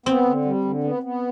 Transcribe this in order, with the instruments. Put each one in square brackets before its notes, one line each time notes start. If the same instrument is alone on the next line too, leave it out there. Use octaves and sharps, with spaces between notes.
[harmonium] B3 [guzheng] C4
[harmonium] D3
G3
D3
B3
B3